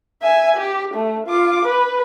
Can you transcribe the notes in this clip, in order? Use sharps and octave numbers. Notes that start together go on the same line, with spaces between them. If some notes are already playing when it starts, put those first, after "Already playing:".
E5 G#5
G4
A3
F4 D6
B4